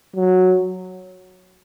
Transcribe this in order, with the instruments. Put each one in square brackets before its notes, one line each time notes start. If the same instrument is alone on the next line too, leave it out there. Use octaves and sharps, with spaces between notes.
[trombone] F#3